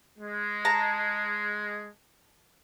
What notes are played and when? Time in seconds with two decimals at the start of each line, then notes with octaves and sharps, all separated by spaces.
0.18 G#3
0.65 A5 A#5